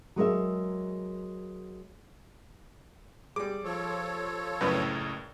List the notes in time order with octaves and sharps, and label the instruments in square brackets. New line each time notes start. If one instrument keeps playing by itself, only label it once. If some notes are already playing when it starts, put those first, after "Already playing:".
[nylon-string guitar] F#3 G#3 A#4 E5
[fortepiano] G3 G#3 [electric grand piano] D6
[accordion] F3 A4 C#5
[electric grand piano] C#2 A2 [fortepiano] F#2 D4 B4